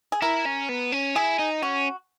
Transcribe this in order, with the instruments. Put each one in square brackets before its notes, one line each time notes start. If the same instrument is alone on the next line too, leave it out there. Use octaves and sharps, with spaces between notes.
[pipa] G#4
[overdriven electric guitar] E4 [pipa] A#4
[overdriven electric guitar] C#4
B3
C#4
[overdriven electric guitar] E4 [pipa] G#4
[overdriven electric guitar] D#4
[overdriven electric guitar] C#4 [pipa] F#4